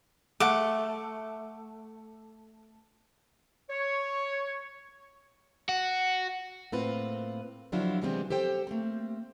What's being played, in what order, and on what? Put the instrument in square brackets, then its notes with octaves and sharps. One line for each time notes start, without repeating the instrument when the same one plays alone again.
[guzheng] A3 [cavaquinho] F#5 D6
[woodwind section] C#5
[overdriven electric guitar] F#4
[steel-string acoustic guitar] A2 A#3 C4 F4 B4
D3 F3 F#3 D4 E4 F4
C3 E3 G3 G#3 B3 C4
G4 A4 C5 G5
A3 A#3 C4